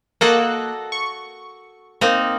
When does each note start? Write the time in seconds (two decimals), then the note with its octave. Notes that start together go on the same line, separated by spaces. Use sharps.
0.21 A#3 F#4 A4 D#5 F#6
0.92 C#6
2.01 A#3 C4 D#4